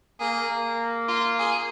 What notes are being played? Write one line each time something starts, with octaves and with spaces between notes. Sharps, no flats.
A#3 G#4
A#3
F4
G#4